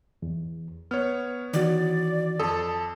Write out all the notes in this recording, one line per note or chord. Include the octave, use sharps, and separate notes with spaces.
E2
B3 C#5 F6
D#3 E3 F#4 D5
F2 A4 D#6